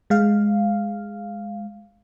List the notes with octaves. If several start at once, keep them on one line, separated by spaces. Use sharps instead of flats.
G#3 F5